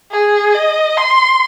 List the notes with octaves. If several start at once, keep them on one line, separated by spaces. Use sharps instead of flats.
G#4
D#5
C6